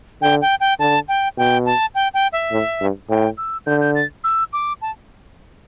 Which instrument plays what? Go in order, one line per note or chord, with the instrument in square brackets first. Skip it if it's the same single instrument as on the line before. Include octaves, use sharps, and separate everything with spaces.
[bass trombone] D3 [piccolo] G5
[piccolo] G5
G5
[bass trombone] D3 [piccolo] A5
[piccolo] G5
[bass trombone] B2 [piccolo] G5
[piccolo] A5
G5
G5
E5
[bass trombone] A2
G2
[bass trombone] A2 [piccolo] G5
[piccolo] E6
[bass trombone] D3 [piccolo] G6
[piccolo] G6
A6
E6
D6
A5